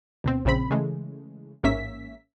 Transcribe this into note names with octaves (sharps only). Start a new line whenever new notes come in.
D2 B2 C4
A#1 A#2 C#3 C4 B5
C#3 E3 G#3 A3
A1 G#2 A#3 C#4 E5 B6